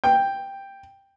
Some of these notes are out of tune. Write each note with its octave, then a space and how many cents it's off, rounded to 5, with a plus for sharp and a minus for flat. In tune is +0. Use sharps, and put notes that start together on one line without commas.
G5 +5